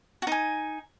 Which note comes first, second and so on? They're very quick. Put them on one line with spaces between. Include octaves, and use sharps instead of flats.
F#4 D#4 G#5